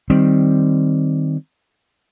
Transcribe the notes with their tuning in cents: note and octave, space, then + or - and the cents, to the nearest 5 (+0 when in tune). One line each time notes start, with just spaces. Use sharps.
D#3 +0 G3 +0 C4 +0